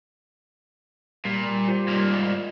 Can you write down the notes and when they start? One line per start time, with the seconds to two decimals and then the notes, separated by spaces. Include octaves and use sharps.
1.25 A#2 G3
1.68 F4 G4 C5
1.88 G#2 A#3